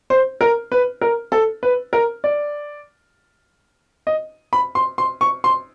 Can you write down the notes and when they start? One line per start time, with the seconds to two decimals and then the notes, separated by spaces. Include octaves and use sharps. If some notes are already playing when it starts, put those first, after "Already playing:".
0.10 C5
0.41 A#4
0.72 B4
1.01 A#4
1.32 A4
1.63 B4
1.93 A#4
2.24 D5
4.07 D#5
4.53 B5
4.75 C6
4.98 C6
5.21 C#6
5.44 C6